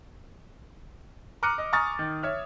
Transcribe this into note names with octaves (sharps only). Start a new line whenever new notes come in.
A#5 D6 F6 F#6 C#7 D#7
D#5
G#5 A#5 C#6 D#6 F6 A6
D#3
C#5 E5 F6